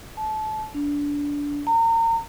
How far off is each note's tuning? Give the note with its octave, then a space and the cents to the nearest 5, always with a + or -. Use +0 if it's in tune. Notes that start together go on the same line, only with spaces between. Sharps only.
A5 -25
D4 -20
A#5 -35